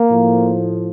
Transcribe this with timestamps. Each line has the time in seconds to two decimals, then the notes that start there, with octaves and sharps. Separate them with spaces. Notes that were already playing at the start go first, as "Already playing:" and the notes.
Already playing: A#3
0.10 A2 F3